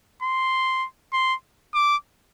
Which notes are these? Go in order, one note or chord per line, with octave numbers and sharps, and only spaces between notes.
C6
C6
D6